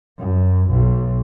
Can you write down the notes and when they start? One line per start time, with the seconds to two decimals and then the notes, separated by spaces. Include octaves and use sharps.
0.18 F#2
0.70 B1